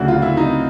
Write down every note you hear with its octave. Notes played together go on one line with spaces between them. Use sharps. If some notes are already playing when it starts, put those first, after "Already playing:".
Already playing: D2 C#3 F#3 E4 F#4
F4
E4
D#4